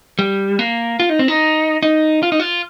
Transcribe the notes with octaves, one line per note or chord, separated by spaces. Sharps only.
G3
A#3
F4
D#4
C4
D#4
D#4
F4
D#4
F4